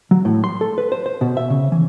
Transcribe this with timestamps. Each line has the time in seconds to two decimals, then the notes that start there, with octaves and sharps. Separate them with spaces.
0.11 F#3
0.25 A2
0.44 C6
0.61 A4
0.78 B4
0.92 C5
1.06 C5
1.21 B2
1.37 E5
1.50 C#3
1.72 E3